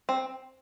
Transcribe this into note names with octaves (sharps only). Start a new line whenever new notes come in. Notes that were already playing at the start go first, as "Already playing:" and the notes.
C4